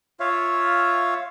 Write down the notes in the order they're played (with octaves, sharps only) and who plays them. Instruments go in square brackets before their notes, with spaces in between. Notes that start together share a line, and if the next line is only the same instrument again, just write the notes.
[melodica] F4 C#5 E5 F5